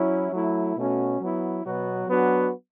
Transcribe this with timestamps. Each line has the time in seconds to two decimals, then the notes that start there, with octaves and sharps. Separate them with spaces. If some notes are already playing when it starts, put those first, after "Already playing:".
Already playing: F#3 C#4 E4
0.33 F#3 A3 E4
0.77 B2 A3 C#4 F#4
1.21 F#3 B3 E4
1.65 B2 F#3 B3 F#4
2.08 F#3 B3 D4 F#4